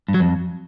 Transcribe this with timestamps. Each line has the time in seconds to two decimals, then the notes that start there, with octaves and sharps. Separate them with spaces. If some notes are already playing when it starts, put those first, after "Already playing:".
0.08 G2
0.14 F#3
0.20 F2